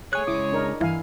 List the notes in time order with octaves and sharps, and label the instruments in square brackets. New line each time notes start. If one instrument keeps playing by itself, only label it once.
[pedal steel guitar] A3 G#5 F#6 [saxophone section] G#4 C#5 [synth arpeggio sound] G#6
[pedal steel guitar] C#3 G#3 [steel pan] E4 D6 D#6
[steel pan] D4 A#4 D#5
[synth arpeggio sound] G2 E3 [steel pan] E4 F5 G#5